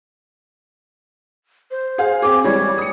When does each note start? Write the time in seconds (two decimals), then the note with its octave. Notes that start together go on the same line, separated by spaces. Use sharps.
1.71 C5
1.98 G#4 F5
2.22 C4 G#4 D6
2.44 E3 G3 G#3 C#5
2.78 D#6 C#7